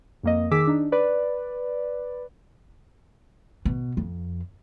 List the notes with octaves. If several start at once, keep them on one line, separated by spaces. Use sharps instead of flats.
F2 A#3 D#5
D#3 G#4 D6 E6 B6
D4 D#4
B4 D5
B2
F2